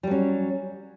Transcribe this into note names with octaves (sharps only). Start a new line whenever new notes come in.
F#3 G3 C#4